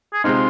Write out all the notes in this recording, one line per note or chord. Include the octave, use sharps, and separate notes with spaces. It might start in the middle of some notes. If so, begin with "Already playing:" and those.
G#4
C3 G#3 C4 D#4 F4